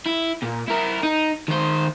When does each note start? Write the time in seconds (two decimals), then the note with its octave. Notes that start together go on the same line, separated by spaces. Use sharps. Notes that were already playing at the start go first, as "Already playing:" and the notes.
0.06 E4
0.43 A#2
0.68 E4 A#4
1.03 D#4
1.48 D#3 C5